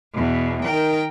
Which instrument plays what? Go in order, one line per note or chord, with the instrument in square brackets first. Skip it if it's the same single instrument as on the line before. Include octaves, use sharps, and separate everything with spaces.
[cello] E2 B2
[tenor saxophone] D#3 [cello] A#4 G5